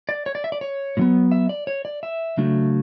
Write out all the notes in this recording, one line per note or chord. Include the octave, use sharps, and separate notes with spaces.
D5
C#5
D5
E5
D5
C#5
A2 F#3 B3
E5
D5
C#5
D5
E5
C#3 F#3 A3 D4